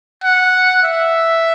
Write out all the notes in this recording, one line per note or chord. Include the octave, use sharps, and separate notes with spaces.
F#5
E5